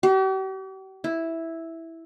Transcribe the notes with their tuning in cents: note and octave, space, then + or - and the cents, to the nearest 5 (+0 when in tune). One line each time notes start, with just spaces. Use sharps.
G4 -45
E4 -5